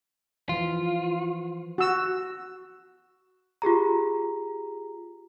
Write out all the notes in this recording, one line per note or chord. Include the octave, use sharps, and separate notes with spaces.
E3 F3 F4
F#4 E6
F4 G4 G#4 A#5